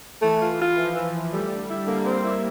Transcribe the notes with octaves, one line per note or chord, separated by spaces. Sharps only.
E3 A3
F4
F4
E3 F3
E3
E3
G3 A3
D3
E4
D3 A#3
C4
E4